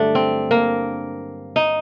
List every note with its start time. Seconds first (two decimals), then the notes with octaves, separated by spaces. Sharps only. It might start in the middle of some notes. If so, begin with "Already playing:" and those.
Already playing: G2 D3 F#3 A3 D4
0.15 C4
0.51 A#3
1.56 D#4